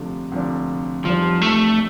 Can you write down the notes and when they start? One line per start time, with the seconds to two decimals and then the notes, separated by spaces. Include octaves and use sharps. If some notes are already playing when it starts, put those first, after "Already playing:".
Already playing: D2 C3 F3 A3 D4
0.32 D2 C3 F3 A3 D4
1.05 F1 E2 C3 F3 G3
1.42 A3